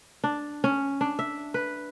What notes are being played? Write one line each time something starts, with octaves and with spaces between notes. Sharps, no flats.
D4
C#4
D4
E5
B4